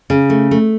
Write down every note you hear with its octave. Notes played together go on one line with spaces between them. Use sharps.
C#3
A3
A3